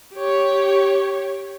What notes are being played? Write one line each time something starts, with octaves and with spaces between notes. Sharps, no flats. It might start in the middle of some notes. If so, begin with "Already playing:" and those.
G4 C#5